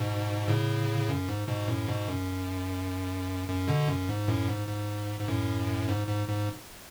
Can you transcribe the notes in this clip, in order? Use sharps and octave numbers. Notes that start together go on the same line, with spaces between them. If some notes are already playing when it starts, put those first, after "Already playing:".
Already playing: G#2 B2
A2 C#3
F#2
G#2
G#2 B2
F#2 A2
G#2 B2
F#2
F#2
B2 D3
F#2
G#2
F#2 A2
G#2
G#2
G#2
F#2 A2
G#2
G#2
G#2